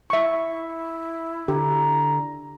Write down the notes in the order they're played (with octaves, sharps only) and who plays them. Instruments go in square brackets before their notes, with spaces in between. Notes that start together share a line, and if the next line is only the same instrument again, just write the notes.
[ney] E4 [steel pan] E5 C#6
[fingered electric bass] D3 [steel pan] G4 [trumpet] A#5